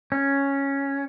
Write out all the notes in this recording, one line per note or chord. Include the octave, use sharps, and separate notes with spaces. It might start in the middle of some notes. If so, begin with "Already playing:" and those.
C#4